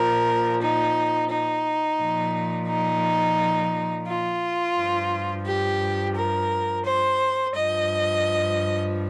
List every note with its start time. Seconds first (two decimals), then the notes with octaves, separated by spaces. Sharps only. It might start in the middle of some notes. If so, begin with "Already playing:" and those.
Already playing: A#2 F3 A#4
0.61 D#4
1.30 D#4
2.00 A#2 F3
2.69 D#4
4.07 F4
4.76 G2 F3
5.45 G4
6.15 A#4
6.84 C5
7.54 G2 F3 D#5